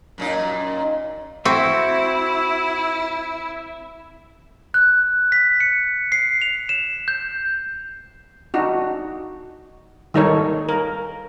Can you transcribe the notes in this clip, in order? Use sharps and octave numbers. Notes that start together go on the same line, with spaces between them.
F#2 A#2 D#4
C4 E4 F#4 E5
F#6
B6
C#7
C7
F7
E7
G6
D4 D#4 F#4
D#3 G3 D#4 A4 A#4 C#5
A#4